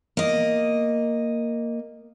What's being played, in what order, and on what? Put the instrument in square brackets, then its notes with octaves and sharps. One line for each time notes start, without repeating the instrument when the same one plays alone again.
[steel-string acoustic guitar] A#3 D#5